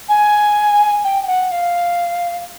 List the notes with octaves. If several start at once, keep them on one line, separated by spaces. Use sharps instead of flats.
G#5
G5
G5
F#5
F5